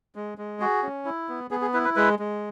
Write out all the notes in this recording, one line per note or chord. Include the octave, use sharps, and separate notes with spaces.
G#3
G#3
F#4 G#4
C#4
E4
B3
B3 G#4
G#4
E4 B4
B4
G#3 B4
G#3